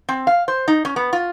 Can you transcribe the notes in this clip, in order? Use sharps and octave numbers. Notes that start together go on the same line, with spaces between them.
C4
F5
C5
D#4
C#4
B3
F4